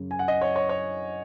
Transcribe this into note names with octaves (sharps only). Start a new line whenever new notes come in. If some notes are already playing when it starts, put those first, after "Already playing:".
Already playing: F#2 C#3
G#5
F#5
D#5
C#5
C#5
C#5